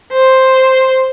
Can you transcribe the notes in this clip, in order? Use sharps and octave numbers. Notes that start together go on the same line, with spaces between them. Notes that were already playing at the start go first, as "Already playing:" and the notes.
C5